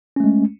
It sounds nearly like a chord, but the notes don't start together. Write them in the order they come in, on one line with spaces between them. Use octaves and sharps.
C#4 A3 G#3